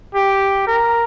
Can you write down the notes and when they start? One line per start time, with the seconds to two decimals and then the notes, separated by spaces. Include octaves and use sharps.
0.15 G4
0.67 A#4